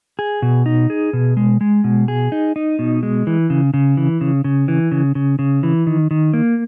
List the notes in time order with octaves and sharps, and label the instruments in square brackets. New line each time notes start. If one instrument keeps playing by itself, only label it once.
[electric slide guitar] G#4
B2
D#4
G#4
B2
G#3
G#3
B2
G#4
D#4
D#4
B2
G#3
E3
C#3
C#3
E3
C#3
C#3
E3
C#3
C#3
C#3
E3
D#3
D#3
A#3